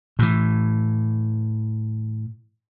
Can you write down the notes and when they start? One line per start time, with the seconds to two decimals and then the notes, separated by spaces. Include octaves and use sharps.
0.19 A2 E3